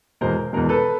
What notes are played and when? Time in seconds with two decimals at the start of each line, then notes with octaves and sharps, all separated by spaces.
0.21 E2 B2 G#3 A#4 C5
0.53 E2 B2 G#3 A#4
0.69 A4 B4